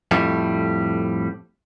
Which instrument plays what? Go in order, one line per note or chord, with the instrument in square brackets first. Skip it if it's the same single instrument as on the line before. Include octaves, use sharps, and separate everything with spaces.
[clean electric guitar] F2 A2 G3